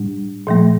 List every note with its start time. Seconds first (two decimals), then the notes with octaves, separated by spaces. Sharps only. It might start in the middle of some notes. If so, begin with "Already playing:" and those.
Already playing: A2 G3 D4
0.47 A#2 F3 A3